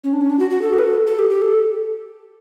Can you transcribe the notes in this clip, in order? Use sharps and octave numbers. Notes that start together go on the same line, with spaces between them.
C#4
D4
C#4
D4
F#4
F#4
A4
F#4
B4
A4
A4
G4
G4
A4